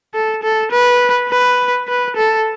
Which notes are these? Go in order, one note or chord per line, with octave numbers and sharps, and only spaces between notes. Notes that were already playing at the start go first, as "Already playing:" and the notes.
A4
A4
B4
B4
B4
A4